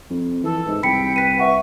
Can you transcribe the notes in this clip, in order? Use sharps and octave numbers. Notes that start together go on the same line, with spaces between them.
F2
E3 A4
G#2
C2 G5 B5 B6 C#7
B4 B6 D#7
B4 E5 F#5 C#6